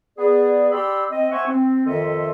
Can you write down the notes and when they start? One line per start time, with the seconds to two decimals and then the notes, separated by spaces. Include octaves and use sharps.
0.17 B3 G#4 D5
0.72 G4 D5 B5 C6 E6
1.11 C4 D#5
1.31 C5 E5 F#5 G#5 C#6
1.47 C4
1.86 F2 D#3 A4 D#5 E5 C6